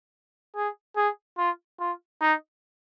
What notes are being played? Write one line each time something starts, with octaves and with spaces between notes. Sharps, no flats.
G#4
G#4
F4
F4
D#4